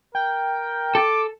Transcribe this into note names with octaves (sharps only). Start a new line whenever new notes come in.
A#4 G5
A4 D6